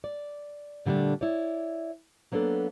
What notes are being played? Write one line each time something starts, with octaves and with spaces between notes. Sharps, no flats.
D5
A#2 D3 G3 A3 D4
E4 C#5 D5
F#3 A#3 B3 D4 A4